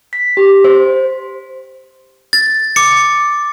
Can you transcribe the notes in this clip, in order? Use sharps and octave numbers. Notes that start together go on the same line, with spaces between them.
B6
G4
C5
A6
D6 C#7